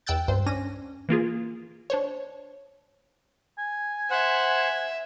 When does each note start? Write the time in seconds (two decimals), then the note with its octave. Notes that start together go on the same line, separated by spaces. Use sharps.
0.07 E2 G5 E6 F#6 G6 A6
0.28 C#2 G2 C5
0.46 C#4 D4 A#6 D#7
1.09 E3 A#3 F4 G#4
1.90 D4 C5 C#5
3.58 G#5
4.11 C5 E5 F#5